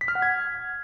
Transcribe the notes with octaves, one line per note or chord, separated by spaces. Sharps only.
B6
F6
F#5
G#6